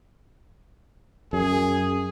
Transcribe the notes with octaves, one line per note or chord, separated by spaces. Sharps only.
F#2 G#4